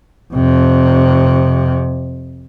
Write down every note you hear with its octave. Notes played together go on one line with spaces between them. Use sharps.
F2 C3